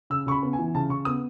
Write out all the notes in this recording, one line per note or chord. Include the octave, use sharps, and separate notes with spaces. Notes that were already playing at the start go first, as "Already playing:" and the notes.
C#3 E6
C#3 B5 C#6
B3
G#5
E3
C#3 A5
C#3 C#6
B3 D#6